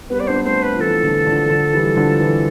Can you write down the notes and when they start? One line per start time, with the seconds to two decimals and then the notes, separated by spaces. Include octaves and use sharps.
0.10 G3 B3 B4
0.19 C4 D5
0.27 B3 D4 C5
0.45 A3 C4 C5
0.63 B4
0.74 F3
0.80 E3 A4
1.03 D3
1.26 D3 F3
1.50 D3 F3
1.73 E3 G3
1.96 D3 F3
2.20 E3